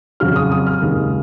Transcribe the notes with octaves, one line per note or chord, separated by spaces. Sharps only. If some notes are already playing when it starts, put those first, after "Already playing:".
F2 C#3 F#3 F6
D#6
D#6
F6
D#2 C#3 G#3